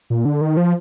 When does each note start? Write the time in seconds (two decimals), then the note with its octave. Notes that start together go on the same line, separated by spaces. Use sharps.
0.10 A#2
0.25 D3
0.41 D#3
0.57 F3